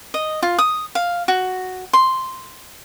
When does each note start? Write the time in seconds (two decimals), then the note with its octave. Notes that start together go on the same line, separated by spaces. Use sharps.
0.14 D#5
0.43 F4
0.58 D#6
0.95 F5
1.28 F#4
1.93 C6